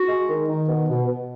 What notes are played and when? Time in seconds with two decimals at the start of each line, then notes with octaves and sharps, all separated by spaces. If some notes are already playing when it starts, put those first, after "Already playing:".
Already playing: F#4
0.09 G#3
0.29 D#3
0.49 D#3
0.68 B2
0.88 B2
1.08 B2